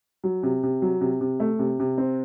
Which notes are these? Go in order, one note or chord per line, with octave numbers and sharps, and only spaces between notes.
F#3
C3
C3
F#3
C3
C3
A3
C3
C3
C4